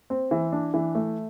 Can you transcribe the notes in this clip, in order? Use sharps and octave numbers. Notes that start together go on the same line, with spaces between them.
C4
E3
D4
E3
A3